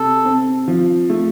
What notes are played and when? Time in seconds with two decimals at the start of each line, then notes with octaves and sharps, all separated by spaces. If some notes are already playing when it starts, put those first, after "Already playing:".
Already playing: C3 A4
0.25 C4
0.68 F3
1.09 A3